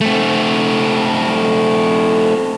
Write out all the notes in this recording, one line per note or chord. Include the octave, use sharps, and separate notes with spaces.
A3 C4